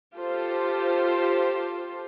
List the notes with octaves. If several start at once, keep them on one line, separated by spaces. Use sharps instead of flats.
F4 G4 A4 C5